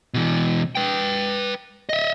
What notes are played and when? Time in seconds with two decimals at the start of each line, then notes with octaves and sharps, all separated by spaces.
0.14 B2 E3
0.75 B4 G5
1.89 D#5 E5